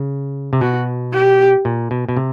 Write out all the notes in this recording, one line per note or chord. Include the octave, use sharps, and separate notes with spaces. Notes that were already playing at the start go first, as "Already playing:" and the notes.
Already playing: C#3
C3
B2 F#4
G4
A#2
B2
B2
C3